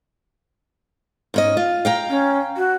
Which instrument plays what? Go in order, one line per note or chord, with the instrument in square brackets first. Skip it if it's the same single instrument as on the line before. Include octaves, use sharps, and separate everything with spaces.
[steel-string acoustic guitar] G#2 C#4 D#5
F4
F5 G5 A#5
[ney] C#4
F#4